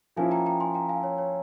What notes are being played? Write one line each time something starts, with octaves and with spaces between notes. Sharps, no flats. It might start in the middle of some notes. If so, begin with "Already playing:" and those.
F3 A#3 C#4 E4 F5 G#5
G5 A#5
G5 A#5
G#5 C6
G5 A#5
F5 G#5
C#5
C#5